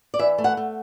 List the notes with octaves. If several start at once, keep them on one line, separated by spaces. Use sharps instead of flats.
D5
E3 E5
A3
F#5
A3